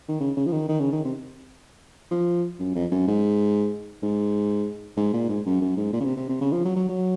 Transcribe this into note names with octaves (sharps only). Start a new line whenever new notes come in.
D#3
C#3
C#3
F3
D#3
D#3
C#3
D#3
C3
F3
F#2
F2
F#2
G#2
G#2
G#2
A#2
G#2
F#2
F#2
G#2
A#2
C#3
C3
C3
C3
C#3
F3
F#3
F#3
F#3